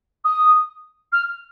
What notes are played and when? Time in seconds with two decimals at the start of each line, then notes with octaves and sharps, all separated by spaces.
0.24 D#6
1.12 F6